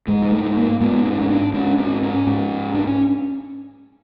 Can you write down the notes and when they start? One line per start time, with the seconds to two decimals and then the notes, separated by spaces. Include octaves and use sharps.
0.08 G#2 G#3
0.25 G#3
0.32 A3
0.57 A#3
0.81 G#2 B3
1.05 C#4
1.13 C4
1.21 C#4
1.30 D4
1.54 G#2 C#4
1.78 C4
2.03 C#4
2.27 G#2
2.74 D4
2.87 C#4